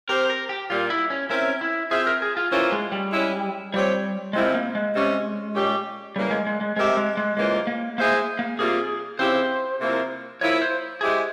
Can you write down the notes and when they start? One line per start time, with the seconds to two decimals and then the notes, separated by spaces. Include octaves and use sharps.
0.09 C4 G4 A#4 C5
0.30 A#4
0.49 G4
0.69 A#2 G3 A#3 F4
0.90 E4
1.10 C#4
1.30 C4 C#4 E4 A#4 E5
1.61 E4
1.91 C4 F4 G#4 C5 E5
2.07 A#4
2.22 G#4
2.37 F4
2.52 E3 A#3 C#4 E4 F4 C5
2.72 G#3
2.92 G3
3.13 G#3 C#4 E4
3.73 F3 G3 C4 G4 C#5
4.33 C3 F3 G#3 C4 E4 A#4
4.54 A#3
4.75 G#3
4.95 C3 G3 C#4
5.55 A#2 G3 C#4 G4
6.16 C#3 E3 G3 A#3
6.31 G#3
6.47 G#3
6.61 G#3
6.76 G#3 C4 G4 A#4 E5
6.97 G#3
7.17 G#3
7.37 C#3 E3 G#3 A#3 F4 C5
7.67 A#3
7.98 G#3 A#3 E4 G#4 C5 E5
8.39 A#3
8.59 C3 G3 A#3 F4 G#4
9.19 C#3 F3 C4 E4 G4 C5
9.81 C3 F3 A#3 E4 A#4
10.41 F3 A#3 E4 C#5
10.62 C5
11.01 G#3 E4 G4 G#4 C5 E5